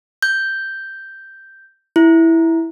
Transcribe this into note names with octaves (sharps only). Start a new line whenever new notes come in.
G6
E4